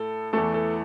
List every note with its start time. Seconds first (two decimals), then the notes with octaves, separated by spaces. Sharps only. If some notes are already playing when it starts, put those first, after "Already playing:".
Already playing: A2 A4
0.33 E2 E3 A3 A4
0.54 A4